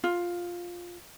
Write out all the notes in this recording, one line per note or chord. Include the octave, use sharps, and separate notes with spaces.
F4